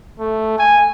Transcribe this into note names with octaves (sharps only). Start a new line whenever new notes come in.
A3
G#5